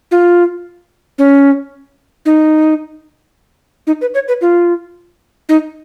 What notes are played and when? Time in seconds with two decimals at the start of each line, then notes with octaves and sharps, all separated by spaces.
0.11 F4
1.18 C#4
2.26 D#4
3.87 D#4
4.01 B4
4.14 C#5
4.28 B4
4.41 F4
5.49 D#4